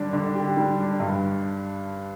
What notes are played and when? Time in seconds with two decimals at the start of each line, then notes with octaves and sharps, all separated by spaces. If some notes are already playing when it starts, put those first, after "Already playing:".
Already playing: D3 G3 D4
0.13 D3
0.35 G4
0.57 G3
0.78 D4
1.00 G2